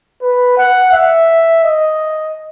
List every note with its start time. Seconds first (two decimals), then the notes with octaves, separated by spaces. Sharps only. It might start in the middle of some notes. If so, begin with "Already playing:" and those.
0.22 B4
0.58 F#5
0.93 E5
1.64 D#5